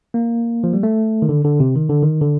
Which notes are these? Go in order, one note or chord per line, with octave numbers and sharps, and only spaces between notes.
A#3
F3
G3
A3
D#3
D3
D3
C3
D#3
D3
D#3
D3